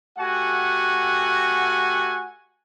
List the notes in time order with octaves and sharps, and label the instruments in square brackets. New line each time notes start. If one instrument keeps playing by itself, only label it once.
[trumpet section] A3 F#4 G4 F#5 G#5